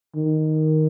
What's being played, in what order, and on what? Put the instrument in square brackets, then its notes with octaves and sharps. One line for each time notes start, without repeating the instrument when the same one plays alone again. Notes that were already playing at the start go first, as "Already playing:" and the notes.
[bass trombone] D#3